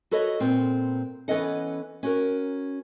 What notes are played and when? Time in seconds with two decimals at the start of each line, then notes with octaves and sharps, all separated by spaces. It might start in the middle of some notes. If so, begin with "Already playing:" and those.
0.11 F#4 A4 B4 C#5 D#5
0.40 A#2 B3 C4
1.28 E3 B3 C#4 A4 D#5 F#5
2.03 C#4 F#4 A#4